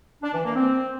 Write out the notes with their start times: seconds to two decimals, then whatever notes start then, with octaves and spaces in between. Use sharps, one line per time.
0.23 D4
0.34 E3
0.45 A#3
0.56 C4